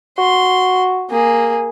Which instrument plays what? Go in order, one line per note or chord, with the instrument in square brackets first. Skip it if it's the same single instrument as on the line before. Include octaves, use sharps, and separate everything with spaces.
[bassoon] F#4 [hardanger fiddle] C6
[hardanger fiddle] A#3 G#4